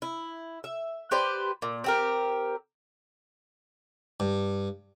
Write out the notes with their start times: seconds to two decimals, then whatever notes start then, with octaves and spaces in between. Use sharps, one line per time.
0.02 E4
0.64 E5
1.11 G4 B4 C5 D5
1.62 A#2
1.84 C4 G4 A#4
4.20 G2